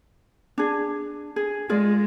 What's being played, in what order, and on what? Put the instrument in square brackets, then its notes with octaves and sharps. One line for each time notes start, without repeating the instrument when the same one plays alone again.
[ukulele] D4 G#4
G#4
[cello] G#3 [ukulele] F4 G#4 D5